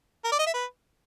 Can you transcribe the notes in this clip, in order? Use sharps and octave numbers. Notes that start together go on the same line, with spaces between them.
A#4
D5
D#5
E5
B4